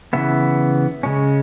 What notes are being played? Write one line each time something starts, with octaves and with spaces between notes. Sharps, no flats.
C#3 E3 B3 E5
C#3 G#3 C#4